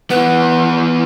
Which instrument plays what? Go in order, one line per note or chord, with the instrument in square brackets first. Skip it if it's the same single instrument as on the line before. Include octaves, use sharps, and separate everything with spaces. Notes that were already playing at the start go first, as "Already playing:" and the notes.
[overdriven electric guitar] E3 B3 [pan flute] B4 [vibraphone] F#5